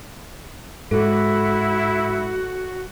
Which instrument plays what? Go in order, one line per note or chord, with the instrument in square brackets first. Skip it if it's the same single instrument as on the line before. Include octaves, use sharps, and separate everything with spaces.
[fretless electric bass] G#2 [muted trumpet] E4 [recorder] F#4 [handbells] A4